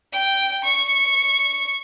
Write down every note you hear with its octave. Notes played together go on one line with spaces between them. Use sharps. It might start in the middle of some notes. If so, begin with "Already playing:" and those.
G5
C#6